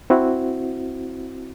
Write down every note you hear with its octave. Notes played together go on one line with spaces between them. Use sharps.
C4 E4 F#4